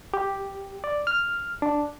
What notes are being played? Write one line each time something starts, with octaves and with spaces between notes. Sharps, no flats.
G4
D5
F6
D4